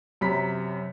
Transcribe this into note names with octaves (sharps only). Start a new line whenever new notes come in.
F#2 C3 A#5 B5 B6